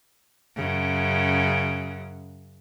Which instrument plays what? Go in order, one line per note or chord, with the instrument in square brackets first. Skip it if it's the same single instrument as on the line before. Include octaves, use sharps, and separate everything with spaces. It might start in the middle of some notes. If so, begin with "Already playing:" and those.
[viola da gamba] F#2 C#3